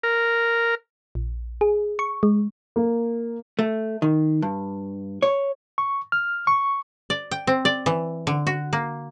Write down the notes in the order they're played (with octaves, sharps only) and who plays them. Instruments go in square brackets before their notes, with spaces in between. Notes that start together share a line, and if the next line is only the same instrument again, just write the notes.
[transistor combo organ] A#4
[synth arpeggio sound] A#1
G#4
C#6
G#3
[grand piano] A#3
[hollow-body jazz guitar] A3
D#3
G2
C#5
[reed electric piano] C#6
F6
C#6
[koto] D5
G5
C4
D5
E3
D3
F#4
A#3